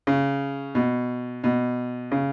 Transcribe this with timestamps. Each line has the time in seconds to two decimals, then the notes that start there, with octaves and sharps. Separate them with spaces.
0.07 C#3
0.75 B2
1.44 B2
2.11 C#3